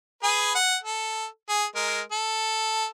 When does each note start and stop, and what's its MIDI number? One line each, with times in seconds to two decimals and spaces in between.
0.23 0.53 68
0.23 0.53 71
0.23 0.53 80
0.55 0.76 78
0.84 1.26 69
1.49 1.65 68
1.75 2.01 56
1.75 2.01 70
2.12 2.86 69